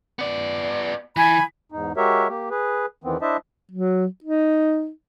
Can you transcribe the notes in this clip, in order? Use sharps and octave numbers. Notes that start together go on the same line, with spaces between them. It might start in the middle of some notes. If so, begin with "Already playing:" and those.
B3 D5
E3 G#5 B5
E2 G#2 D#4
G#3 F#4 G4 A#4 C#5 E5
A#3 G4
G#4 B4
E2 D#3 E3 B3 C4
D4 E4 C5 D#5 E5 A5
F#3
D#4